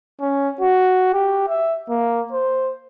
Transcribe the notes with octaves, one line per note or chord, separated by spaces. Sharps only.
C#4
F#4
G4
E5
A#3
C5